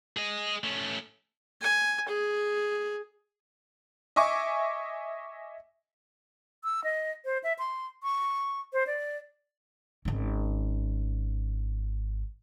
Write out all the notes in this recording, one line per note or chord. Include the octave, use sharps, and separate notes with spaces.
G#4 D#5
A3 C#4
G#5
G#4
D#5 E5 G#5 C#6 D6
E6
D#5
C5
E5
C6
C#6
C5
D5
G#1 C#4